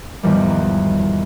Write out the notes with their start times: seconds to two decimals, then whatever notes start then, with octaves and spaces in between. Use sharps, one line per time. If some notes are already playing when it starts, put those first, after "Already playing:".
0.23 E2 G#2 D#3 F3 G3